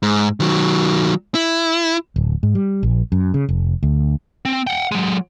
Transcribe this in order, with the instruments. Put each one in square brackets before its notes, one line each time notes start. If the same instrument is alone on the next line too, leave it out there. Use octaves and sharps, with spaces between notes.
[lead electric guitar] G#2
D#3 F#3
E4
[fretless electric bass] D1
G#2
G3
A#1
F#2
C#3
F1
D2
[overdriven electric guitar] C4
F#5 G5
F#3 G#3